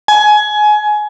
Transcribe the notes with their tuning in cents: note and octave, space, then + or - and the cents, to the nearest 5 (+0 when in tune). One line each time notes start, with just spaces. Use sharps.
G#5 +20